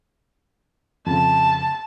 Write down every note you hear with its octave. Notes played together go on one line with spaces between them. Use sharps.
F2 C#3 A5